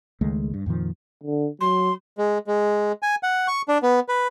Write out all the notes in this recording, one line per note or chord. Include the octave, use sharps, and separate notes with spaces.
C#2 D#3 G#3 A3
G2
F2 A#2 D#3 F3
D3
F#3 C6
G#3
G#3
G#5
F#5
C#6
D4
B3
B4